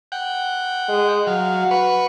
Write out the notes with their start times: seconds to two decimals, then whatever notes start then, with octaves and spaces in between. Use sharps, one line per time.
0.12 F#5 G5
0.89 G#3
1.27 F#3 F#4 F5
1.71 B4 C#6